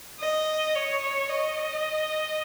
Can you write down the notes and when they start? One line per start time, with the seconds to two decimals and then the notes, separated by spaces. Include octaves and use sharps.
0.20 D#5
0.75 C#5
1.29 D#5